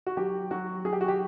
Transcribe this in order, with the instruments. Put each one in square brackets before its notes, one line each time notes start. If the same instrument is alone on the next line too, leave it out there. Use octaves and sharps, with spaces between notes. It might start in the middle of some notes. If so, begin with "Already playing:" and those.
[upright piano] F#4
F#3 G4
F#3 F#4
F#3 G#4
G4
F#4
G4